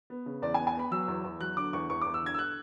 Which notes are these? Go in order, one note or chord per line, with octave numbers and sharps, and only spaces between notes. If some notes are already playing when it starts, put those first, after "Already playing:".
B3
C#3
E2 D5
G#5
B3
G#5
B3 B5
F#3 E6
E2
E2
F#3 F#6
D3 D6
E2 C#6
E2 C#6
D6
E2
E6
D3 G#6
E6
F#6